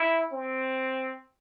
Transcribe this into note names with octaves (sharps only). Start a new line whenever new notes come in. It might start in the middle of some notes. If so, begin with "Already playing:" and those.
Already playing: E4
C4